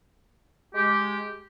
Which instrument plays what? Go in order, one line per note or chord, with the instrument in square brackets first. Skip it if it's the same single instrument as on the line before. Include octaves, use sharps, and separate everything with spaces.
[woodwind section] G#3 G4